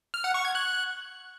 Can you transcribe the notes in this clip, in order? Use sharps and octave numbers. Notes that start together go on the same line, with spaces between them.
F6
F#5
C#6
G#6
F#6